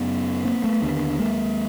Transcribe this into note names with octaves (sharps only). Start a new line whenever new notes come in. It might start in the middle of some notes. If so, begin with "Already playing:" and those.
Already playing: F#2 C#3 B3 C#4
A#3 C4
A3 B3
D#2 D3
G#3 A#3